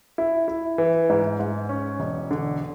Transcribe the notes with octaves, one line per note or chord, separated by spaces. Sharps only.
E4
E4
E3
G#2
G#2
C#4
E1
D3